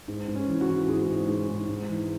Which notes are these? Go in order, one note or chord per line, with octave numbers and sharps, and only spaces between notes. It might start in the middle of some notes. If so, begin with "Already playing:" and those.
G#2
G#2
C#4
E3
F#4
E3
G#2 G#4
G#2
G#2
G#2
G#2
E3